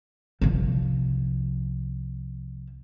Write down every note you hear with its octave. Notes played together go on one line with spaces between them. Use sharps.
C2 F3